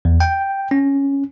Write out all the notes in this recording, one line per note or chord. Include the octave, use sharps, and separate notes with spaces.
E2
G5
C#4